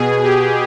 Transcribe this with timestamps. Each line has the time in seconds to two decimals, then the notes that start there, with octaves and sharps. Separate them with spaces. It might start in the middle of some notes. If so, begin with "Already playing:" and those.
Already playing: B2 G#4
0.23 G4